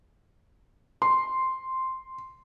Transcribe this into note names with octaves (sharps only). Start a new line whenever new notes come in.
C6